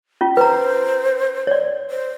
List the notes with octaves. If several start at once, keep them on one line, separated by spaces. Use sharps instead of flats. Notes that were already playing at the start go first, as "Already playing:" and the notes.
C#4 F4
B4 C5 A#5
C#5 D5
C5